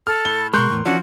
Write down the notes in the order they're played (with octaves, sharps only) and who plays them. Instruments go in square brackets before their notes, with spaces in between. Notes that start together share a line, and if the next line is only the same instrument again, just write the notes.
[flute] A4 [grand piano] F6
[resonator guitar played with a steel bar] A2 [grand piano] G7
[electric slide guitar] B2 G#3 [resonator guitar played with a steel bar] A#4 [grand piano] C6 F#6 G6 [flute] C#6
[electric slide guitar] E2 A2 C#3
[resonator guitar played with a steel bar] E3 C#4 D4 [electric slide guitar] F3 [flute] F#4